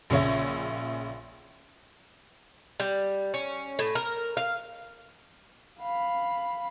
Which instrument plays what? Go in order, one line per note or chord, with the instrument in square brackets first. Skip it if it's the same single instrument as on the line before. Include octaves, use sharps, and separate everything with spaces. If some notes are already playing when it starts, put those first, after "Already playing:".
[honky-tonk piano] A#1 C#3 C#5 E5
[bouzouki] G3
C#4
A2
A#4
F5
[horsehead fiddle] F5 B5